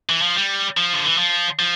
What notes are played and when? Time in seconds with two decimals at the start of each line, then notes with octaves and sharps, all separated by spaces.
0.09 E3
0.22 F3
0.36 G3
0.77 F3
0.93 D3
1.05 E3
1.18 F3
1.59 F3